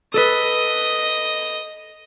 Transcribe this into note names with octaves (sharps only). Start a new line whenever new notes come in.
A4 B4 D#5